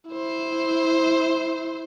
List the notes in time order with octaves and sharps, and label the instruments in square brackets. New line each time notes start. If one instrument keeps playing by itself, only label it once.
[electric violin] E4 C5